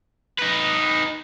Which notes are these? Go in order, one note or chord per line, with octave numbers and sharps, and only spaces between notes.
D#4 B4